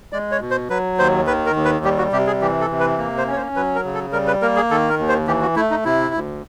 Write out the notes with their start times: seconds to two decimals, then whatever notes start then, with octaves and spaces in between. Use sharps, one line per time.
0.12 G#3 D5
0.32 C#5
0.41 B2
0.51 C5
0.70 F#3 B4
0.98 D#2 C5
1.27 D#3 B4
1.46 A#4
1.56 D#2
1.65 B4
1.84 G3 G4
1.98 F#4
2.12 C3 G4
2.27 G#4
2.41 E3 G4
2.61 A4
2.70 C3
2.80 B4
2.98 A#3
3.18 C5
3.27 C#4
3.32 C#5
3.36 C5
3.56 F#3 B4
3.75 A#4
3.85 C#3
3.94 A4
4.13 G3 A#4
4.27 B4
4.42 A#3 A#4
4.56 G#4
4.71 D#3 A4
4.89 A#4
4.99 D#2
5.08 C5
5.27 E3 G4
5.42 F#4
5.56 A3 E4
5.71 D#4
5.85 C3 E4
6.14 D2